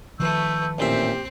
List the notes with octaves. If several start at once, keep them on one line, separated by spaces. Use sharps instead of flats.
D#3 F3 A3 B4 C#6 E6 G6
A1 A#2 C4 G4 E5